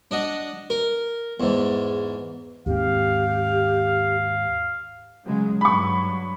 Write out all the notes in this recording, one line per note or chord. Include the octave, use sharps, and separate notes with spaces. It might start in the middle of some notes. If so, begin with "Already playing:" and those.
D4 D#5 F#5
A#4
E2 G#2
D#2 G#2 C4 G4 F5
C#3 F#3 G#3
G2 F#3 B5 C#6